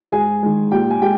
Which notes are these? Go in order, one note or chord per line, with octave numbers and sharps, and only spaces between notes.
G#2 G#4 G#5
D#3 G#3
A#2 G4 G5
G#5
G#3 G4 G5